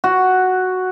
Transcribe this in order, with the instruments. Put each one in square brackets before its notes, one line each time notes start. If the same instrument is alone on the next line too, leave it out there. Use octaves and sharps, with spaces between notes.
[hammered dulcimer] F#4